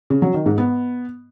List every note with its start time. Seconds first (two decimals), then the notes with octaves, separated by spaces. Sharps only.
0.10 C#3
0.22 F#3
0.34 D#3
0.46 G#2
0.58 B3